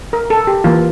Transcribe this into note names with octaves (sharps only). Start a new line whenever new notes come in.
A#4
A4
G4
E3 A#3 F4